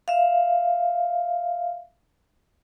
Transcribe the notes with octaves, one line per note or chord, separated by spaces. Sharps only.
E5 F5